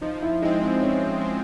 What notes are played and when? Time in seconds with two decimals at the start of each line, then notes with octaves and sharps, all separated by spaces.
0.01 F3 D#4
0.22 E4
0.42 G#3 C4 D#4
0.62 D#4
0.82 F3 C#4
1.21 G#3 C4